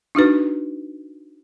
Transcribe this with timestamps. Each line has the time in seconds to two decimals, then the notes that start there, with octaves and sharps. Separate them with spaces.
0.15 D4 D#4 F#4 B4